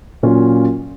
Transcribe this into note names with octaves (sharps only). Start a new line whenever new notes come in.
A#2 F#3 C#4 F4